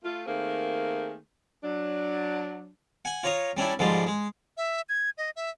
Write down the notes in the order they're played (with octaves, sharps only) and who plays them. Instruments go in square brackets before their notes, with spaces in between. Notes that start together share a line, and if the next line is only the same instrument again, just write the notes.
[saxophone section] A3 F4
D#3 A3 A#3 C4 G#4
F#3 D4
[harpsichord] F#5 G#5
F4 C#5 A#5 D#6
G3 C#4 D4 E4
G#2 D3 F3 G3 G#3
G#3
[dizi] E5
G#6
D#5
E5